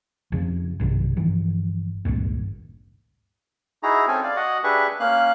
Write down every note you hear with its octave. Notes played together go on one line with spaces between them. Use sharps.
F2 C#3 F3
B1 G2 C3 D#3
G1 G2 E3 F3
G#1 C#2 G2 A#2
D#4 E4 F#4 G#4 A#5
C4 C#4 A4 G#5
D5 F5
F#4 D#5 F#5
D4 G4 G#4 B4 E5 C#6
A#3 C#4 F5 F#6